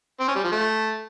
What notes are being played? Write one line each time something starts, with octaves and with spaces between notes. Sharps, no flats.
C4
C#4
G3
F3
A3